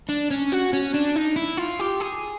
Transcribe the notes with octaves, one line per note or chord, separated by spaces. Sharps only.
D4
C#4
F#4
C#4
D4
D#4
E4
F4
G4
G#4